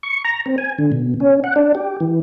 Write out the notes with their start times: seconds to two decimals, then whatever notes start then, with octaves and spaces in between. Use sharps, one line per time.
0.03 C#6
0.25 A#5
0.46 C4
0.58 G#5
0.78 D3
0.92 B2
1.20 C#4
1.44 F#5
1.56 D4
1.75 G4
2.00 E3